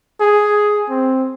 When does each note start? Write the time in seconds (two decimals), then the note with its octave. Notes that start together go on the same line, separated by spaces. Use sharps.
0.21 G#4
0.89 C4